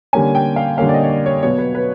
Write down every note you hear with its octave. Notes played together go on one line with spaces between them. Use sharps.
D3 G3 A#3 C#4 G#5
G5
F5
D3 G3 A#3 C#4 F5
D5
D#5
C#5
D5
C#5
B2 F#3 B3 C#5
B4
B4